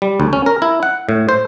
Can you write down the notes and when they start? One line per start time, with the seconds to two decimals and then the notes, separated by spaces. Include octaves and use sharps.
0.02 G3
0.20 D2
0.33 C#4
0.46 A#4
0.62 E4
0.83 F#5
1.09 A2
1.29 C5